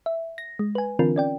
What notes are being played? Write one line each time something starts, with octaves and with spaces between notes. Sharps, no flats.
E5
A#6
G#3
B4 G#5
D3 E3 C4 D4 F4 A#4
C#4 D5 G5